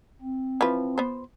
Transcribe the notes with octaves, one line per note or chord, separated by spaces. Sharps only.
C4
E3 F3 B4
B3 C5